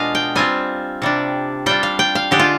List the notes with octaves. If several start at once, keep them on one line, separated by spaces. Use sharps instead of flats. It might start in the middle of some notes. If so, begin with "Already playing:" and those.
Already playing: B2 G#3 D4 F4 D#5 F5
G5
G3 C4 F4 G#5
C3 G3 D4
G3 D4 F4 G5
F5
G5
F5
D3 G#3 D4 G4
F4